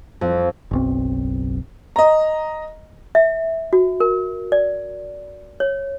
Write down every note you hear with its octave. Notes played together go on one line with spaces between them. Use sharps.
F2
F#1 B1 C4
D#5 A#5
E5
F#4
A#4
D5
C#5